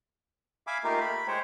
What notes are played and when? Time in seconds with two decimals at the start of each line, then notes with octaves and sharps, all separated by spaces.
0.67 E5 F5 G#5 B5 D6
0.84 A3 A#3 D#4 F4 G4 A#4
1.00 B5
1.28 G#3 C5 C#5 G5